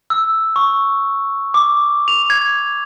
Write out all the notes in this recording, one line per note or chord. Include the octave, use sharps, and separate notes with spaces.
E6
C#6
D6
F7
G#6